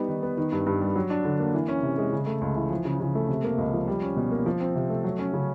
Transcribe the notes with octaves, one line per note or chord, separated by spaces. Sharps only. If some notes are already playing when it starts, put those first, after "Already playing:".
Already playing: G3 B3 D#4
D#3
B3
D#3
G2
G2
G3
F#3
D4
D3
A#3
E3
C#4
C3
G#3
C#3
A3
C#2
E3
F3
C#3
C#3
A3
C3
A#3
C#2
F3
G3
C#4
B2
A#3
F3
C4
C3
A3
F#3
C#4
C#3